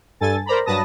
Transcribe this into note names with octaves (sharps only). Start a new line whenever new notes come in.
G2 A4 G#5 A6
A#4 C5 D5 A#5 B5
G2 F#3 B4 A5 D#6 A#6